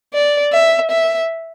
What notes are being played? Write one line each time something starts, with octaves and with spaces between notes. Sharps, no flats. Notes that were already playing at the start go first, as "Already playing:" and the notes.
D5
E5
E5